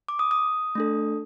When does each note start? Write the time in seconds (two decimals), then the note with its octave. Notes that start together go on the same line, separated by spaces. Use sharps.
0.08 D6
0.19 D#6
0.31 D#6
0.75 A3 D4 A4